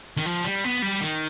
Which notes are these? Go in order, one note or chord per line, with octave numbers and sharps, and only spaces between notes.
D#3
F3
G3
B3
G3
D#3